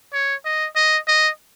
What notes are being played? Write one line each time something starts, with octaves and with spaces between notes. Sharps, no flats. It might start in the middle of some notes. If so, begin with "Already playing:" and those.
C#5
D#5
D#5
D#5